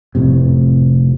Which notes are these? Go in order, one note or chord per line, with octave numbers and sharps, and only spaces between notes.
F1 B1 A2 C3